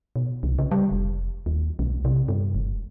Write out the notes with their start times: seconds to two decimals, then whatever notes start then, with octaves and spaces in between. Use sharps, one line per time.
0.16 B2
0.43 C2
0.59 C#3
0.71 G3
0.91 F1
1.46 D#2
1.79 B1
2.05 C3
2.28 G2
2.55 F#1